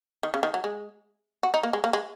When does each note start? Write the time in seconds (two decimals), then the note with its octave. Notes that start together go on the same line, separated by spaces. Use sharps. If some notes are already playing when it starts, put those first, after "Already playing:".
0.23 D#3
0.34 C#3
0.43 D#3
0.54 F#3
0.64 G#3
1.43 F#4
1.54 D#4
1.63 A#3
1.73 G#3
1.84 A#3
1.93 G#3